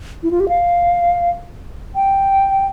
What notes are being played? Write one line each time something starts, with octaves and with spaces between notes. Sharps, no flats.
E4
F4
G4
F5
G5